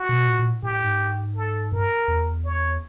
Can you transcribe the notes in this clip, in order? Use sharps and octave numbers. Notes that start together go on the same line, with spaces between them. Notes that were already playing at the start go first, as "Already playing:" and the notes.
Already playing: F#4
B2
A#2
A#2
A2 G4
G#2
A4
G2 A#4
E2
C#5